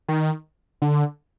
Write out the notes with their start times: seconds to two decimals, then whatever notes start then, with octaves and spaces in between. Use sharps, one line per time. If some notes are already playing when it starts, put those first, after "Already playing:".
0.08 D#3
0.82 D3